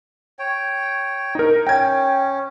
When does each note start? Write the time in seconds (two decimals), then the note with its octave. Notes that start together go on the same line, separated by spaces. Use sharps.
0.39 C#5 G5
1.35 D#4 A#4
1.67 C#4 G5 G#6